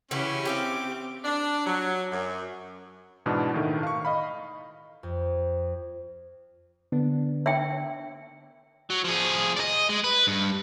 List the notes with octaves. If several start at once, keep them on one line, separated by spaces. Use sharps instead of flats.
C#3 E3 C#4 E4 F#4 G4
C4 G4 E5 F5 D6
D4
F#3
F#2
G#2 B2 E3 B3 D4
A2 D#3 A3
F5 C#6
D#5 F5 B5
F2
D3 B3 D4
E5 G5
F#3
F3 G#4
D5 D#5
G#3
B4
G2